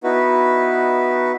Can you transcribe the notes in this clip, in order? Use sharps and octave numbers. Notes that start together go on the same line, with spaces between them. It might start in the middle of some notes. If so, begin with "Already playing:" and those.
B3 D#4 E4 F#4 B4